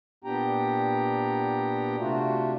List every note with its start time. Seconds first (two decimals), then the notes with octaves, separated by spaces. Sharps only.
0.24 A#2 B3 D4 G4 G5 A#5
1.99 C3 A3 D4 F4 F#4